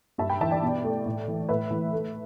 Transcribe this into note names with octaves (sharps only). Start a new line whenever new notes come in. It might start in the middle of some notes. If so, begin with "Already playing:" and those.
G2 E5 A5
G5 B5
E3 E5 A5
D5 G5
B2
A3
A2
E3
A2 B4 E5
E3
A3